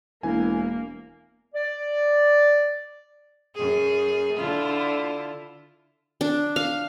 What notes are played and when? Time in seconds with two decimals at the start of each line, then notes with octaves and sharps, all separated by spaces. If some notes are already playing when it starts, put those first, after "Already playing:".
0.23 E1 E3 A#3 G#5
1.55 D5
3.55 F#2 G#4
4.37 D3 E4 F4
6.21 D4
6.56 F5